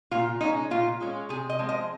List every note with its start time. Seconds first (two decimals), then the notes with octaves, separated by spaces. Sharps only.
0.11 A#2 F4
0.41 G#3 C#4 D#4
0.71 A#2 F4
1.01 G#3 C#4
1.29 C3 G#4
1.49 D#5
1.59 F3 G#3 C4
1.69 D#5